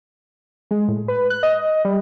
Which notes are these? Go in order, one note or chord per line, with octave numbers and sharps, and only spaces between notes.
G#3
A2
B4
F#6
D#5
G3